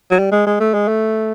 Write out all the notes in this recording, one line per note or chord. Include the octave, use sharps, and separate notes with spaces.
F#3
G3
G#3
G#3
A3
G#3
A3